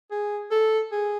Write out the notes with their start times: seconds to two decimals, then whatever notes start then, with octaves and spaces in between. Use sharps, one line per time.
0.11 G#4
0.51 A4
0.92 G#4